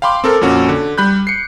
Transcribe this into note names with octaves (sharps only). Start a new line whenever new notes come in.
F5 G5 B5 C6 D6
C4 A4 A#4
F2 A#2 C#4 F#4
D3
G3 B5 F#6 G6
C7 C#7